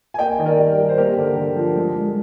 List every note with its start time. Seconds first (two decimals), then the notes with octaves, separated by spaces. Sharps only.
0.14 G#5
0.18 A#3 D#5 G5
0.38 D#3 D#5
0.45 A#4 D5
0.58 G3
0.78 G3
0.89 C5
0.98 A#3 G4 A#4
1.17 D3
1.36 D3
1.56 F3
1.76 G#3
1.96 G#3